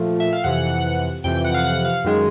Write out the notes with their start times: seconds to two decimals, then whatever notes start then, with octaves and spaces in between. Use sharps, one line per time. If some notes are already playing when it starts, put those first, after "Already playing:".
Already playing: A#2 F3 A3
0.20 E5
0.33 F5
0.44 F2 C3 E3 F#5
1.24 F2 C3 E3 G5
1.44 F#5
1.54 F5
1.64 F#5
1.85 F5
2.04 F#2 D#3 G#3